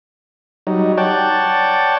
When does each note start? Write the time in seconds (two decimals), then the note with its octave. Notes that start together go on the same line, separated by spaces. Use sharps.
0.67 F#3 G3 D#4
0.98 C#5 D5 F#5 G5 A5